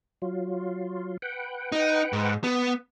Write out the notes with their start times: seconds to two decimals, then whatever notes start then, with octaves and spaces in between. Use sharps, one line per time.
0.22 F#3 F4
1.22 B4 F#5 G5
1.72 D#4
2.13 G#2
2.44 B3